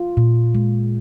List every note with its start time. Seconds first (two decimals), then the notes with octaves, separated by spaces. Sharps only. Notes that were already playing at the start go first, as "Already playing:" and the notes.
Already playing: F4
0.17 A#2
0.55 G#3